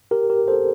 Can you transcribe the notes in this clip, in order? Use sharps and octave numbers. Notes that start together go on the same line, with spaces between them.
G4 A#4
G4 A#4
A4 C5